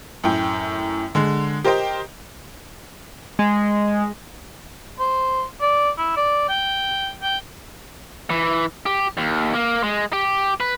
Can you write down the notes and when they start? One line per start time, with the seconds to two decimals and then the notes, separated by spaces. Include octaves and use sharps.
0.24 F#2 A2 G5
1.15 D3 G#3
1.64 G4 A#4 C5 D#5 G5
3.39 G#3
4.99 C5
5.61 D5
5.97 E4
6.16 D5
6.49 G5
7.22 G5
8.30 E3
8.86 G4
9.17 D#2
9.54 A#3
9.84 G#3
10.13 G4
10.60 B4